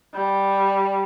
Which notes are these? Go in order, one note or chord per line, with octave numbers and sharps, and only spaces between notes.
G3